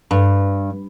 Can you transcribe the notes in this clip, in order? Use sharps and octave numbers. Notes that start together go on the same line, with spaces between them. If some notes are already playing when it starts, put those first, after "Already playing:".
G2